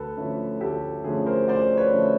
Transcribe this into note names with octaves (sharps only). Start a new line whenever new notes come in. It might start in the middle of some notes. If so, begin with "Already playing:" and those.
Already playing: D2 A4 B4
D3 F3 A3 C#4
D2 G4 A4
D3 F3 A3 C#4 G#4
A#4 C5
D2 C5 D5
B4 C#5
D3 F3 A3 C#4